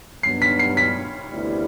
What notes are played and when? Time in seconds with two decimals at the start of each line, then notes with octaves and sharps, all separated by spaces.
0.23 G2 F#3 B3 D4 C7
0.42 B6
0.59 C7
0.77 B6
1.30 D2 C3 G3 B3 E4